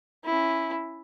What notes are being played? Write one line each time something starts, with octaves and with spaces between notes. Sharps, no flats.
C#4 E4